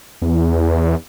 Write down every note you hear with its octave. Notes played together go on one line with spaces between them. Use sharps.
E2